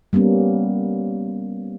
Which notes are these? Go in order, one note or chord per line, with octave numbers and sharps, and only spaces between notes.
G3 A#3 B3 C#4